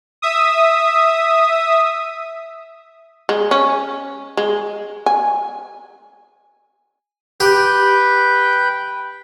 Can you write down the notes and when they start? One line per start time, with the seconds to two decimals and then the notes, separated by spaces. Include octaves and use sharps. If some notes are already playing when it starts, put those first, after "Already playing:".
0.22 E5 D#6
3.29 G#3
3.51 C#4
4.37 G#3
5.06 G#5
7.40 G4 B4 G5